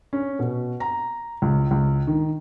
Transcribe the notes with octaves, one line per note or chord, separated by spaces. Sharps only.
C#4
B2
A#5
C#2
C#2
D#3